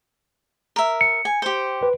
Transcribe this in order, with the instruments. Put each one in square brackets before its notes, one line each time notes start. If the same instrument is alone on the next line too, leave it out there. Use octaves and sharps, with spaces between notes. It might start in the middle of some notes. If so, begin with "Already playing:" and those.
[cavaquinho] A#4 E5
[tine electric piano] C#7
[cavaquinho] G#5
G4 C5
[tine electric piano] B4